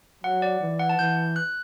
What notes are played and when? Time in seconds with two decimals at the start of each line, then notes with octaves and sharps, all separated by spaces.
0.24 F#3 F#5
0.42 D5
0.60 E3
0.79 F#5
0.89 A5
0.98 E3 G6
1.36 F#6